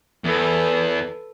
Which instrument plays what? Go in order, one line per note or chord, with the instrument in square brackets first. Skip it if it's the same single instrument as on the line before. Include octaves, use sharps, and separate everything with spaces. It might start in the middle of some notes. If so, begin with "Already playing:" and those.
[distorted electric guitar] E2 [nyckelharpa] A4 B4